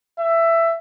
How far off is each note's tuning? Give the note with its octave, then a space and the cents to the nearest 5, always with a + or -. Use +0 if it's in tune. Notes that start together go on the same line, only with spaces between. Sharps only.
E5 +15